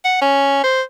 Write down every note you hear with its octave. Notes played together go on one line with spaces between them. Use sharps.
F#5
C#4
C5